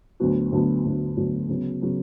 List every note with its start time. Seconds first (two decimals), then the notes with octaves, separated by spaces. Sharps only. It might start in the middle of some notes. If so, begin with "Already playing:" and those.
0.20 D2 D3 F#3 B3 F#4
0.52 D2 D3 F#3 B3 F#4
0.85 D2 D3 F#3 B3 F#4
1.17 D2 D3 F#3 B3 F#4
1.49 C#3 F#3 B3
1.81 C#3 F#3 B3